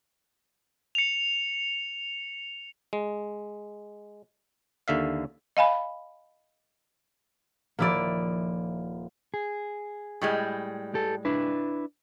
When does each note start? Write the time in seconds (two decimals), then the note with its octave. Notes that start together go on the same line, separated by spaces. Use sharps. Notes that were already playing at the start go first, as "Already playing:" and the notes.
0.95 C#7 F7
2.93 G#3
4.88 D#2 D3 E5 F5
5.57 D#5 F5 G#5 B5
7.79 D#1 F3 A#3 E4 D5 A6
9.34 G#4
10.21 A2 G3 G#3
10.94 G4 A4
11.25 D4 E4 B4